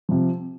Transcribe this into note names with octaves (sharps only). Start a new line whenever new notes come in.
C3 F3